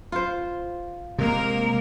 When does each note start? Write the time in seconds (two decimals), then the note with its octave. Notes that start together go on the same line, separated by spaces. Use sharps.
0.12 F4 C5
1.18 C3 G#3 A#3 A#4